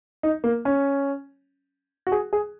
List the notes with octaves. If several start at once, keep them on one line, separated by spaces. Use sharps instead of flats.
D#4
A#3
C#4
F#4
G#4
G#4